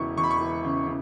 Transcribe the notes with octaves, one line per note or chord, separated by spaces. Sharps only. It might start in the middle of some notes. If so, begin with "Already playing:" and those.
Already playing: E1 C#3 E3 C#6
E1 C#6
B5
C#6
E3
C#3
C#3